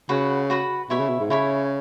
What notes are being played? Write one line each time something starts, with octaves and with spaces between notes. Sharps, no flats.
C#3 F#4 B4 F#5 B5
F#4 B4 F#5 B5
B2 E4 C#5 E5 B5
C#3
B2
G#2
C#3 E4 C#5 E5 B5